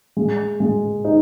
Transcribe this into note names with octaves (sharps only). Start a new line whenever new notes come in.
G#3
G#3
D#4